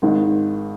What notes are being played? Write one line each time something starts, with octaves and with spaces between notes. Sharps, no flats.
G#1 G#2 D#3